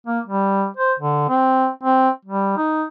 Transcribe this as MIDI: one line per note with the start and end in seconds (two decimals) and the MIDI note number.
0.07 0.20 58
0.27 0.66 55
0.77 0.93 72
1.00 1.27 50
1.29 1.68 60
1.83 2.09 60
2.25 2.55 55
2.57 2.84 63